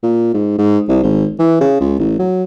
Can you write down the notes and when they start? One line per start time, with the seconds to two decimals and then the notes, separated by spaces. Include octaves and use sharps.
0.03 A#2
0.34 G#2
0.59 G#2
0.88 C2
1.03 G#1
1.39 E3
1.61 C#3
1.80 C#2
1.99 A1
2.19 F#3